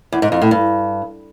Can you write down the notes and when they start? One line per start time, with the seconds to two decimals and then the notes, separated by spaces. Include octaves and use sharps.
0.12 E2
0.22 G#2
0.32 F2
0.42 A2
0.51 G2